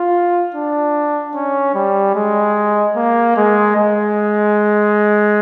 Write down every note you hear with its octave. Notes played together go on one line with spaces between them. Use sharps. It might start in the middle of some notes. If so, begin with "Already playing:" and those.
Already playing: F4
D4
C#4
G3
G#3
A#3
G#3
G#3